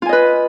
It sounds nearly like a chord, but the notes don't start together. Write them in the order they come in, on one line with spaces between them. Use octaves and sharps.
F4 G#5 D#5 B4